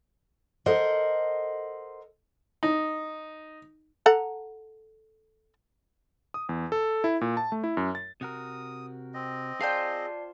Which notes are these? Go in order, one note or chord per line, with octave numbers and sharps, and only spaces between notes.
A4 A#4 C5 D#5 F#5
D#4
A4 F#5 A#5
D#6
E2
A4
E4
A#2
A5
A3
E4
F#2
A6
C3 F#4 A#4 D#6
C4 D#5
F4 G#4 C5 D5 F5 G5 A5 C7